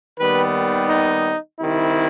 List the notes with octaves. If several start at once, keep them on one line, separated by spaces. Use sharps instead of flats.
D#2 D#3 G3 B3 B4
D#4
C2 C3 D#3 E4